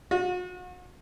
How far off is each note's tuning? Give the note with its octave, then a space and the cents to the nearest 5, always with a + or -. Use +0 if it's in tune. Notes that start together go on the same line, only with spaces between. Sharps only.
F#4 -40